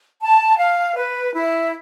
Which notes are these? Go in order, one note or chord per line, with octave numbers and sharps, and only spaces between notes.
A5
F5
B4
E4